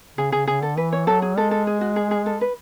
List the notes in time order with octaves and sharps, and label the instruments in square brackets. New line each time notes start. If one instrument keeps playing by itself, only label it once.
[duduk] C#3 [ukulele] G#4
[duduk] C#3 [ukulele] G#4
[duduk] C#3 [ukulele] G#4
[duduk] D3 [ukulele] A4
[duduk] E3 [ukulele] B4
[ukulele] C#5
[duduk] F#3 [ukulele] A4
[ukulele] G#4
[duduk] G#3 [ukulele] A4
[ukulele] A4
G#4
F#4
G#4
G#4
A4
B4